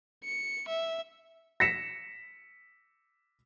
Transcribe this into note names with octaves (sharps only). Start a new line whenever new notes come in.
C#7
E5
A#6 B6 C#7 E7